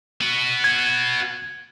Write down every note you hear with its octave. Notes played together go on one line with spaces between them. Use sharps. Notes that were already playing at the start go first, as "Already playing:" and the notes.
B3 F#4
G#6